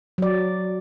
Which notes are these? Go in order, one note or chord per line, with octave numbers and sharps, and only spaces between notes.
F#3 D5